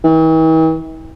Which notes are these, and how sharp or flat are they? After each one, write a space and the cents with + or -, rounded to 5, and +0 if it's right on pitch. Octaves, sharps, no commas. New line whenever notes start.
E3 -45